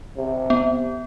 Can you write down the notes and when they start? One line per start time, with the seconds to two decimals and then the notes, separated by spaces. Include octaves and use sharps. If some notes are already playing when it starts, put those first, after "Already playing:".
0.17 C3
0.50 B3